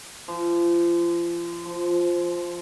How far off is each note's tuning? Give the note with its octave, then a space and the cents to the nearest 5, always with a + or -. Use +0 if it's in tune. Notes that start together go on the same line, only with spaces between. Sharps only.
F3 -30
F3 +0